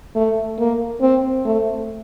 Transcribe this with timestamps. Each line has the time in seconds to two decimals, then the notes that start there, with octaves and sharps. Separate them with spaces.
0.16 A3
0.59 A#3
1.02 C4
1.46 A3